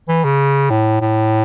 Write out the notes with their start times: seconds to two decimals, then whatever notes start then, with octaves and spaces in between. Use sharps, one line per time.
0.09 E3
0.24 C#3
0.70 A2
1.01 A2